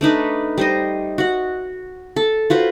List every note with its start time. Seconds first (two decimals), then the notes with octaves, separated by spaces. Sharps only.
0.01 A3 D4 D#4 B4
0.58 G3 C5 D#5
1.18 F#4 F#5
2.16 A4
2.50 F4 F#4 B4 C5